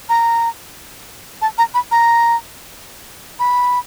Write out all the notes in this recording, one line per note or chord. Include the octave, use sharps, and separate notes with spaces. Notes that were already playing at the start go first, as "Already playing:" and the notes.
A#5
A5
A#5
B5
A#5
B5